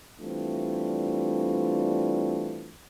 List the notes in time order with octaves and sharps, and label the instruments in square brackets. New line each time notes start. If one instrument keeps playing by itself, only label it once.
[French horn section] E3 G3 A3 C4 D4 F4